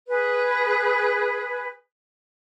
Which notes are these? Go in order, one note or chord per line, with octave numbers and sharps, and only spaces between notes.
G#4 B4